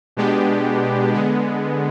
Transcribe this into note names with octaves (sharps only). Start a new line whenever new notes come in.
B2 G#3 B3 D4 G4
D3 G#3 B3